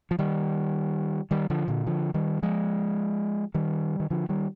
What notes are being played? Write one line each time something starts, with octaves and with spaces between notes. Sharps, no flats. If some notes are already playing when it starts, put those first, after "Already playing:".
F3
D#3 G3
D#3 G3
D3 F3
A#2 D3
D3 F3
D#3 G3
F3 G#3
D#3 G3
D#3
D3 F3
D#3 G3